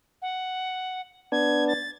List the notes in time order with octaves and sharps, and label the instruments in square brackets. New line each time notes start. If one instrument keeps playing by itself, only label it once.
[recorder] F#5
[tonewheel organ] B3 D4 [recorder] G#6
[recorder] A6